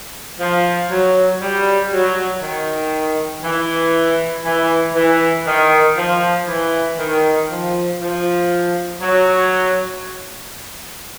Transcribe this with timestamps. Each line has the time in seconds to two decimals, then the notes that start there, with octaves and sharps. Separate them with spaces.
0.40 F3
0.91 F#3
1.42 G3
1.92 F#3
2.42 D#3
3.43 E3
4.45 E3
4.95 E3
5.47 D#3
5.97 F3
6.47 E3
6.99 D#3
7.50 F3
8.00 F3
9.01 F#3